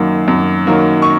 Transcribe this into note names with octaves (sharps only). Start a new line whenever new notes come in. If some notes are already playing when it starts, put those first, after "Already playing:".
Already playing: F#2 D#3 F#3 A#3
F#2
D#3 F#3 A#3
C#6